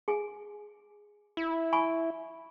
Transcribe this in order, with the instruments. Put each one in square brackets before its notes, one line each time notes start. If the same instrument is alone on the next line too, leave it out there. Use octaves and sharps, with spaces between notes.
[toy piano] G#4 G#5
[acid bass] E4
[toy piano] G#5 B5 C#6